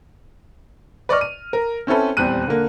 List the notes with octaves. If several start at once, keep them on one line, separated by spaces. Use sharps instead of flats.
B4 D5 D#5 C#6 F6
D#7
A#4
C4 C#4 E4 A4 B4
D#1 E2 G3 C4 F#6 D#7
D3 A#3